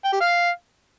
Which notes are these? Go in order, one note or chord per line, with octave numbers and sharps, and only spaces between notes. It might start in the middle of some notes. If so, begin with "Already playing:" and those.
G5
G4
F5